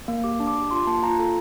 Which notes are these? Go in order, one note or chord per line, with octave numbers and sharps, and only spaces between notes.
A#3
G4 D6
D4
D6
G4
F4 C6
A#3 A5
F4 A#5
A4